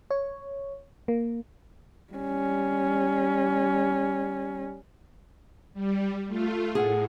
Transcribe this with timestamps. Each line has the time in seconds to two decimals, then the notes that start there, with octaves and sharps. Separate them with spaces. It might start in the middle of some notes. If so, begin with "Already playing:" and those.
0.11 C#5
1.08 A#3
2.13 G3 C#4
5.74 G3
6.28 A3 F4
6.75 A2 G#4 F#5